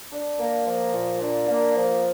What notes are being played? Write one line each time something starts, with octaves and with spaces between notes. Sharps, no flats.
D4
A#3
F3
A#2
D4
A#3
F3